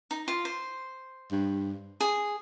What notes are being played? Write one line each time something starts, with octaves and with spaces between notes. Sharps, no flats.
D#4
F4
C5
G2
G#4